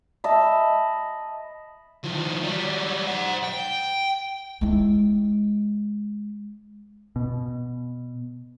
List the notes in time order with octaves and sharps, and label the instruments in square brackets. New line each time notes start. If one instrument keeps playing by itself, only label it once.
[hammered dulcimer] D#5 E5 A5 B5
[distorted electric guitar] D#3 F3
F#3 G3
C5 F#5
G5
[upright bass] G#3 E4
[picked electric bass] B2